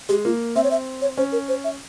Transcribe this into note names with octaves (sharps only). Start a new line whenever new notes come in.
G#3 G4
A#3 F4
C4 E5
C#5
E5
C#5
C#4 C5
A#4
C5
E5